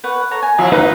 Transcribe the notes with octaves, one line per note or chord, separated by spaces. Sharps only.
B4 C#5 F#5
A4 C#5 A#5
G#5
F3 E4 C#5 F5
D#4 F4 B4 F5 F#5